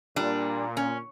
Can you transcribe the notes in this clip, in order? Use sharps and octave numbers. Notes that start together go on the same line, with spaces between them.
A#2 G3 D4
C#4